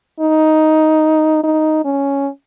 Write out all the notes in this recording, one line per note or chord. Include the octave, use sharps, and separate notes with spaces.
D#4
D#4
C#4